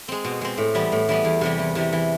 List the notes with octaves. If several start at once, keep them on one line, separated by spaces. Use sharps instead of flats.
G#3 C4
B2
G#3 C4
A2
E3 G3 B3
A2
E3 G3 B3
E2
C3 E3 G3
E2
C3 E3 G3
E3